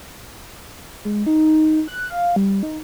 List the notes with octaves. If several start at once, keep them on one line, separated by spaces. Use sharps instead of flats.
G#3
D#4
F#6
F5
G3
D#4